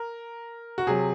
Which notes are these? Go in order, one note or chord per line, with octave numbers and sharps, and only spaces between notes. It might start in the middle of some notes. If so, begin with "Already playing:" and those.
Already playing: A#4
F#4
C3 F#3 G#4